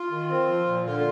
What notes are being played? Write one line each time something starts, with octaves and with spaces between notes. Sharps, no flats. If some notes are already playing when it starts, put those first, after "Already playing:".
Already playing: F4
D#3
C4
F3
A#2
D3 F4